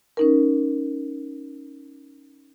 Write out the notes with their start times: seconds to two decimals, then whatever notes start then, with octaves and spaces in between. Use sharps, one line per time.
0.17 C#4 D#4 A#4